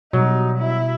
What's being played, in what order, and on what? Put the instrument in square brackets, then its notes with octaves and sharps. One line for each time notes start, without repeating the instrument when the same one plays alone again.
[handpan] B2 G3 [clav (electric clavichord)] F#3 [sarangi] D#4
[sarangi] E4